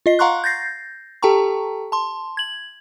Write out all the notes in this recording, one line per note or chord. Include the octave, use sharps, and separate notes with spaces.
F4 D#5 C7
F5 F#5 A#5 C6 C#6 F#6
G6 A6 A#6 C7
G4 A4 G5 A5 A#5 C#6
A5 C6
G#6 F#7